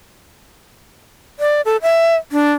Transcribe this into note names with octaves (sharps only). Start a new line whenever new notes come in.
D5
A4
E5
D4